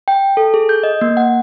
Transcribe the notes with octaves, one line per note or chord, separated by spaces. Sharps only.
G5
A4
G#4
G6
D#5
A#3
F#5